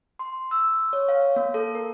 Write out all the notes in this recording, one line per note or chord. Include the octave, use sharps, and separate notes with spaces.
C6
E6
C#5
F5
A#3
A4
A#4